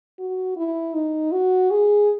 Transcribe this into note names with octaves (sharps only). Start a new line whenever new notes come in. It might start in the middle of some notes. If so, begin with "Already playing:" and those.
F#4
E4
D#4
F#4
G#4